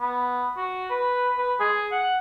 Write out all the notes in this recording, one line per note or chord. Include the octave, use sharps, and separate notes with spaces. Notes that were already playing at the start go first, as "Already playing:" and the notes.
B3
F#4
B4
B4
G#4
F#5